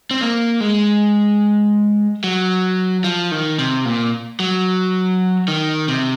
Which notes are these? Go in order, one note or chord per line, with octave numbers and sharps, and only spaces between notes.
C4
A#3
G#3
F#3
F3
D#3
C3
A#2
F#3
D#3
C3